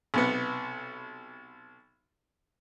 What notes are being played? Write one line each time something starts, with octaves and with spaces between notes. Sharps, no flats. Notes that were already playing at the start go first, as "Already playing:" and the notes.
B1 C3 B3